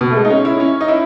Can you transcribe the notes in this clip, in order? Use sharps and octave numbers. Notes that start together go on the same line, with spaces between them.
B2
A3
G#3
D#4
C#4
E4
C#4
D#4
E4